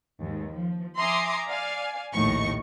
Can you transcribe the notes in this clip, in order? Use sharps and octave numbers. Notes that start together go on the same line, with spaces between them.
D#2 G#2
F3
E5 G#5 A#5 C6 D6 D#6
D5 F5 G#5
A#1 D#2 A2 D#4 C#6